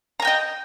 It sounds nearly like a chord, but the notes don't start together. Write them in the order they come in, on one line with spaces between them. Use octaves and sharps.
A#5 G#5 G5 D#5